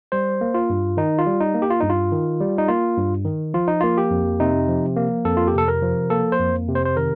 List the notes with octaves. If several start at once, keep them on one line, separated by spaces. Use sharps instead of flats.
G3 C5
A#3
F4
G2
D#3 D#4
F4
G3
D#4
A#3
G4
F4
G2 D#4
F4
D#3
G3
D#4
A#3 F4
G2
D#3
F3 F4
D#4
A#3 F4
G4
F2
C3 D#4
F3
A#3
F2 A4
F4
G4
C3 A4
A#4
F3
A#3 A4
C5
F2
C3
C5
C5
D#3 A#4